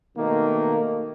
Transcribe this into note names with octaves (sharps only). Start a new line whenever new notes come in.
B2 D#3 A3 A#3